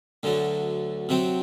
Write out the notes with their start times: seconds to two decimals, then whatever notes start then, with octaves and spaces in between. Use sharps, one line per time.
0.23 D2 D3 F#3
1.09 C3 F#3 C4